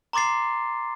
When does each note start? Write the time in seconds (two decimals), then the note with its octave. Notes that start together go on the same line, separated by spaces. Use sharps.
0.13 A#5 C6 D6 A6 C7